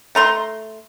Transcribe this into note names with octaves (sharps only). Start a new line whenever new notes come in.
A3 A#5 C6